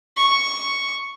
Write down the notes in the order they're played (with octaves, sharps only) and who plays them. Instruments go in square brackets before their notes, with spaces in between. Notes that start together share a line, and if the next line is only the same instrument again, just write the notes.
[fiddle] C#6